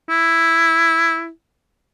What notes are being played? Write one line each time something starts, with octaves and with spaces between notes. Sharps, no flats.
E4